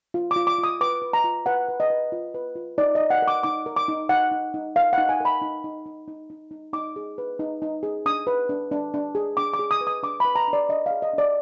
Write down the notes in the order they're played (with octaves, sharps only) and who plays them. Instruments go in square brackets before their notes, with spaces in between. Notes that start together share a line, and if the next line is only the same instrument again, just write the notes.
[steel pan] F4
D6
F4
D6
F4
D#6
B4 D6
B4
A#5
F4
B4 F#5
B4
D#5
B4
F4
B4
F4
D#4 D5
D#5
D#4
F#5
A#4
D6
D#4 D6
A#4
D6
D#4
D#4 F#5
D#4
D#4
A#4 F5
F#5
D#4
G#5
A#4 B5
D#4
D#4
D#4
D#4
D#4
D#4
D#4 D6
G#4
B4
D#4
D#4
G#4
D4 D#6
B4
D4
D4
D4
G#4
D4 D6
D6
G#4
D#6
B4
D#6
D4 D6
B4 B5
A#5
D4
D5
D4 D#5
G#4 F5
D#5
D4
D5